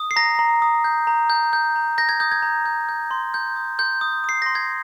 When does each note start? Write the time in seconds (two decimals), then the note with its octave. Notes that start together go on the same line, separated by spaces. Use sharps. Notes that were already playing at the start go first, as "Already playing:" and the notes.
Already playing: D#6
0.11 C7
0.16 A#5 A#6
0.39 A#5
0.62 D#6
0.84 G6
1.07 A#5
1.30 G6
1.53 G6
1.76 A#5
1.98 G6 A#6
2.09 G#6
2.20 D#6 G6
2.31 G#6
2.42 A#5
2.66 G6
2.89 G6
3.11 C6
3.34 G6
3.56 D#6
3.79 C6 G6
4.01 D#6
4.24 D#6 C7
4.42 C6 A#6
4.55 G#6